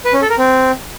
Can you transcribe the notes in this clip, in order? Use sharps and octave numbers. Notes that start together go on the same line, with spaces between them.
B4
C#4
A4
A#4
C4